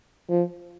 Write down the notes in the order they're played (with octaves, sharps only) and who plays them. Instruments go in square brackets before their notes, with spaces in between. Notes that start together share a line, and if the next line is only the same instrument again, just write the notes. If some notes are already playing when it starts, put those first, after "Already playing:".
[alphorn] F3